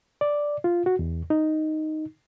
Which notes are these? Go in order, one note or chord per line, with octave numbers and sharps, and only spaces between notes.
D5
F4
F#4
E2
D#4